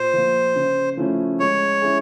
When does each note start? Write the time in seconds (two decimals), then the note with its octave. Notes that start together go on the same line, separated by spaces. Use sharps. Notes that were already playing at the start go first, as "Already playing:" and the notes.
Already playing: A#2 C5
0.14 F3 A#3
0.56 C#3
0.97 F3 A3 C#4 E4
1.40 G#3 C#5
1.81 C#4 E4 G#4